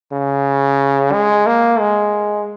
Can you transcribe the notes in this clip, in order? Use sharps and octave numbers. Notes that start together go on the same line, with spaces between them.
C#3
G#3
A#3
G#3